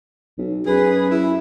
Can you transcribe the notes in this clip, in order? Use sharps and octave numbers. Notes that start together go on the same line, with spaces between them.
B1
F#2 G#4 B4
E4